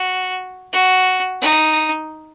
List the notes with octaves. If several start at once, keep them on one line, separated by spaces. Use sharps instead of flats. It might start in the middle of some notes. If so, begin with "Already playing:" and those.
Already playing: F#4
F#4
D#4